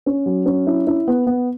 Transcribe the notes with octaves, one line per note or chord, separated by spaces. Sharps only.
C#4
F#3
C#4
E4
E4
B3
B3